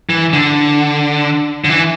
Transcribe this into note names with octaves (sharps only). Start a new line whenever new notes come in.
E3
D3
D3
E3